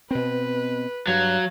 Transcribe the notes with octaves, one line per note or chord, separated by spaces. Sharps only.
B2 C4 B4
G2 F#3 F5